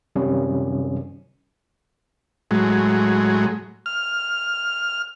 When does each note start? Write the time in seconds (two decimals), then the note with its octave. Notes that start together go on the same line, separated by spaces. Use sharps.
0.16 F#2 C3 D#3 G3 C#4
2.51 A2 F#3 G#3
3.86 F6